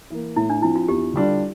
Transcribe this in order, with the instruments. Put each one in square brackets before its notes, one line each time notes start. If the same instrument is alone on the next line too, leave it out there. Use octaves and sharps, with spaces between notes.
[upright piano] E3 A#3
[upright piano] A2 [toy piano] E4
[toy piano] D4
[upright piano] F3 C4 [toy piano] E4
[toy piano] F4
[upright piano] E2 [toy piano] G4
[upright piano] D3 G3 D4 F4